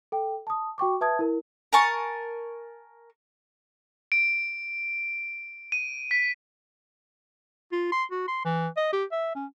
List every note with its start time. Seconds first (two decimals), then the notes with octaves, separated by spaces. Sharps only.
0.12 A4 G5
0.47 A5 D#6
0.78 F#4 G5 C#6 D6
1.01 B4 E5 A5 D#6 G#6
1.19 E4 A#4
1.73 A#4 G#5 A5 C#6
4.12 D7
5.72 D#7
6.11 B6
7.72 F4
7.92 C6
8.11 F#4
8.28 C6
8.45 E3
8.77 D#5
8.93 G4
9.12 E5
9.35 C#4